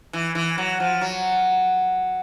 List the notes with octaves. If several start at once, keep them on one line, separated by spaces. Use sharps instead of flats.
E3
E3
F#3
F3
F#3